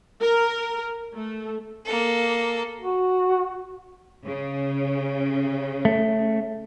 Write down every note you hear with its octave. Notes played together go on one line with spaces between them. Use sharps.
A#4
A3
A#3 A4
F#4
C#3
A3